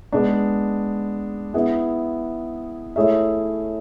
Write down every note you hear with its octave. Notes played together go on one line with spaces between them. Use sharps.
G#3 B3 D4
B3 E4 G#4
A3 E4 G#4 C#5 E5